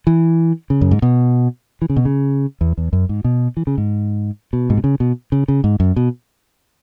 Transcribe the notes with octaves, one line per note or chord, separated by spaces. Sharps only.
E3
C#3
F#2
G#2
B2
E3
C#3
B2
C#3
E2
E2
F#2
G#2
B2
E3
C#3
G#2
B2
G#2
B2
C#3
B2
C#3
C#3
G#2
F#2
B2